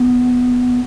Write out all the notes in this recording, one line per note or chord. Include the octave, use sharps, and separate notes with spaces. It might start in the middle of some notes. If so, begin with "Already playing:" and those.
Already playing: B3